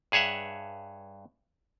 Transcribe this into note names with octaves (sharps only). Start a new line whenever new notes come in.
G2 G#4 C#5 E5 F#5